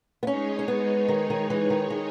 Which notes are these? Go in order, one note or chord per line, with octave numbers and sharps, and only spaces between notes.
B3
G#3 C#4 D#4 G#4 C#5
C#4
B3
D#3
D#3
E3
D#3
D#3